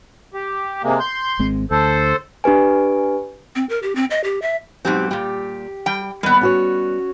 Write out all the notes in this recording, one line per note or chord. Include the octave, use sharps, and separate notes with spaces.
G4
C3 G#3 A#3
C6 G6
G#1 G#3 C4
D2 A4 C5
D4 G4 B4 G#5
C4
A#4
G4
C4
D#5
G4
E5
G#2 B2 F#3 C4 G4
A#2 G3 G4
G3 G5
D#2 G3 B3
C#4 F#4 C#5